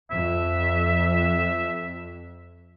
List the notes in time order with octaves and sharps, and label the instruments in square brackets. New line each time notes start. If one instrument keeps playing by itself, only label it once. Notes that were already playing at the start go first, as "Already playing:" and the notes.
[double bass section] F2 [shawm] E5